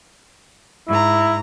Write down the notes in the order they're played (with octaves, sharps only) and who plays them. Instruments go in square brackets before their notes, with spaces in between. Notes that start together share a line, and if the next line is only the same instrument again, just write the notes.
[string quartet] G#2 A#5 [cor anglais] E4